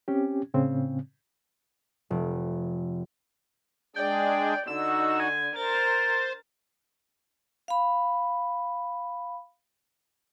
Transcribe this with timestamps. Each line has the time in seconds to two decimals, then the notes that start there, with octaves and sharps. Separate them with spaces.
0.08 C4 C#4 G4
0.54 A2 C#3 C4
2.10 F1
3.96 G#3 D4 G#4 D5 G5
4.68 D3 D#4 F#4 E6
5.20 G#5
5.56 A#4 C5 A6
7.68 F5 B5